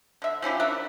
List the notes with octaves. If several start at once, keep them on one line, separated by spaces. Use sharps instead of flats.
D3 E5
F3 C#4 E4 G4
D4 A#4 E5